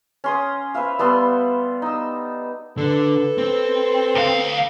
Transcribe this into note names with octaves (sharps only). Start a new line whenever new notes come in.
C#4 C6 D#6
B4 C5 E5 F5
G3 B3 A4 C6
D#4 E6
D3 A4 B4
C4
D2 F5